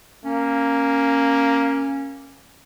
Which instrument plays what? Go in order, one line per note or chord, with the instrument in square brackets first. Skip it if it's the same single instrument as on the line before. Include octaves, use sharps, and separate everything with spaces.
[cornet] A#3 [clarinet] C#4